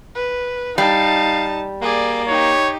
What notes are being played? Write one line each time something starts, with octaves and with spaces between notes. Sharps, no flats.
B4
G3 D#4 F5 A5
A#3 G#4 D5
D#4 G4 C#5